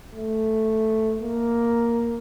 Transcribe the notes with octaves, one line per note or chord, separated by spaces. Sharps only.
A3
A#3